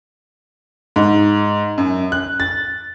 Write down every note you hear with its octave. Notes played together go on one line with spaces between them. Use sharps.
G#2
F#2
F#6
A6